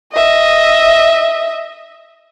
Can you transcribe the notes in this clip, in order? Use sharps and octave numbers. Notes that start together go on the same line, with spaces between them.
D#5 E5